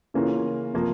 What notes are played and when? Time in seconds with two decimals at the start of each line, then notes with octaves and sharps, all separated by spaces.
0.14 C#3 E3 A#3 C#4 F4
0.73 C3 F3 A#3 F4